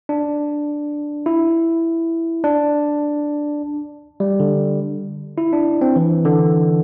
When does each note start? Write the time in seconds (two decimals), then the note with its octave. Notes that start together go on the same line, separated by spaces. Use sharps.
0.09 D4
1.26 E4
2.44 D4
4.20 G3
4.40 D3
5.38 E4
5.53 D4
5.81 C4
5.96 E3
6.25 D3